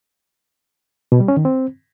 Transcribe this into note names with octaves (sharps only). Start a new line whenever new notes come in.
B2
G3
C#4
D#3
C4